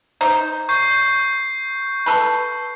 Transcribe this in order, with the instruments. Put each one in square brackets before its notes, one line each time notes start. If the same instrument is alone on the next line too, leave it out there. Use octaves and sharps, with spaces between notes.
[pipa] D#4 C5
[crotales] C#6 G6 C7
[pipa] A4 B4